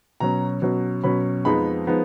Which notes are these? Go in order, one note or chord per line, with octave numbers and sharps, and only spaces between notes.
B2 F#3 C#4 A#5
B2 F#3 C#4
B2 F#3 C#4 B5
F2 F3 G#3 B3 D#4 B5
F3 G#3 B3 D#4